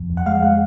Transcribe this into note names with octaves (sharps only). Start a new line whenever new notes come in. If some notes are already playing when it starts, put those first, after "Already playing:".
Already playing: F2
F2
F#5
G#3 F5
G#3 F#5